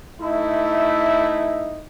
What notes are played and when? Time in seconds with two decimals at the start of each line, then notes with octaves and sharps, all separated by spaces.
0.21 A3 D#4 E4